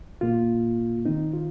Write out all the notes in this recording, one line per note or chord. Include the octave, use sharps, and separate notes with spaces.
A#2 A#3 F4
D#3 C4 D#4
F4